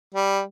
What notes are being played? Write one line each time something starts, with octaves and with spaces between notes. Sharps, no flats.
G3